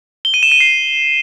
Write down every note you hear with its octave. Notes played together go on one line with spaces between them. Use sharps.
G7
D#7
E7
D#7
C7